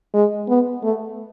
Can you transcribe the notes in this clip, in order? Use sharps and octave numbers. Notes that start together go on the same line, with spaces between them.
G#3
B3
A3